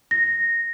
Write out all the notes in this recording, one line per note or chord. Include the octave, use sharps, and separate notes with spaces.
A#6